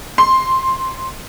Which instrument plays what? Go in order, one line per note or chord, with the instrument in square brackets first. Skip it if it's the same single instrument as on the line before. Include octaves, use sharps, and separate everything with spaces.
[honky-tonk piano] C6